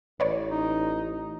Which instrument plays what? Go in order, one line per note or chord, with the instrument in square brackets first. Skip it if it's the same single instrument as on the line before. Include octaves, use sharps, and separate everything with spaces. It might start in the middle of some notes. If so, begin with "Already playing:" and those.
[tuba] A1 [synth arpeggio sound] B4 C#5 D5
[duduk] D#4